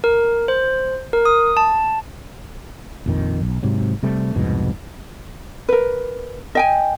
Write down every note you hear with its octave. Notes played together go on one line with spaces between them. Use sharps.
A#4
C5
A#4
D#6
A5
A#1 F2 D#3
B1
G#2 C3 F#3
C3 G3 A3 C4
C2 F2 G#2 B2
A#4 B4
D#5 G5 G#5